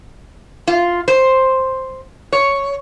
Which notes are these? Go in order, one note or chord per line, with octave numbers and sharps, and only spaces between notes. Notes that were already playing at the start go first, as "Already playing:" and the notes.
F4
C5
C#5